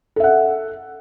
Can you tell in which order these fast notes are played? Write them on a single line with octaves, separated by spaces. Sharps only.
A4 E5 F#5